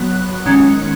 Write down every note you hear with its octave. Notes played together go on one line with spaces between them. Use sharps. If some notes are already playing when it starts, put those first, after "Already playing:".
Already playing: F#3 B3 F#6
D#3 G#3 C#4